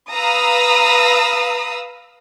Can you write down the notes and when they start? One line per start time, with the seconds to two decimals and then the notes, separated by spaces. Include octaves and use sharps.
0.13 B4 F5 A#5 D#6 E6